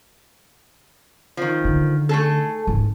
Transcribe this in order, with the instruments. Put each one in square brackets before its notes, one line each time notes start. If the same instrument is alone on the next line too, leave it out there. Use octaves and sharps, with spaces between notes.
[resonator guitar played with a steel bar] D#3 F3
[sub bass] D3 [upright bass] D#4
[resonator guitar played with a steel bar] A3 G#4 A4
[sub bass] D1 [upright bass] G#1